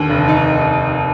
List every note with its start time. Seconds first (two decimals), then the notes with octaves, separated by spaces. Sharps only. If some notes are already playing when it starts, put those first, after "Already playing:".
Already playing: D#2 D3
0.09 F1
0.28 D#4